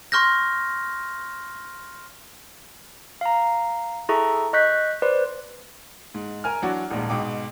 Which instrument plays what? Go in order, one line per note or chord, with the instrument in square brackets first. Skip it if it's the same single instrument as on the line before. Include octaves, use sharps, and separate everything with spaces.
[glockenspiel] C6 C#6 F6 G6 A#6
[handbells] F5 A#5
E4 G#4 A4 E5 A#5 C#6
D#5 C#6 F#6 G6 B6
B4 C5 D5
[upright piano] G#2
A#4 G#5 F6
E3 F#3 D4 F#4
D#1 A#1 G#2
G#2 B2 G5 D6